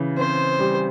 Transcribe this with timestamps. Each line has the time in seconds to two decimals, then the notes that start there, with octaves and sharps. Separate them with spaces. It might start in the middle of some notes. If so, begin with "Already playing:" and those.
Already playing: C#3 E3
0.17 C4 C5
0.59 G3